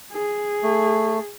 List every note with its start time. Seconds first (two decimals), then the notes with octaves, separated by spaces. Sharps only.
0.13 G#4
0.63 A3